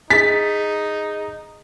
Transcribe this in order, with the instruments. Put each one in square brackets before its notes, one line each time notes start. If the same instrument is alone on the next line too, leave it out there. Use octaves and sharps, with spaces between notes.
[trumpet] D#4 [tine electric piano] G#4 A6 [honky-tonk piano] B6